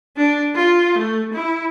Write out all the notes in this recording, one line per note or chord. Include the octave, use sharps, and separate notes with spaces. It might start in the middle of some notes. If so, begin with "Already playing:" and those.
D4
F4
A3
E4